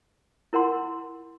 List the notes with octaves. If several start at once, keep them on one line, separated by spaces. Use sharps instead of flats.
E4 A#4 F#5 C6